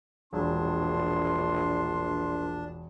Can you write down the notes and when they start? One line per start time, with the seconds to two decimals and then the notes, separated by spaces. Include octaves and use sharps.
0.33 E1 A#1 D4 C6